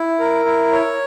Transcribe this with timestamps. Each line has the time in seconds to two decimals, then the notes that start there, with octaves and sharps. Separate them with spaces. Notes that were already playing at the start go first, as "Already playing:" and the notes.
Already playing: E4
0.19 A#4
0.45 E4
0.72 C#5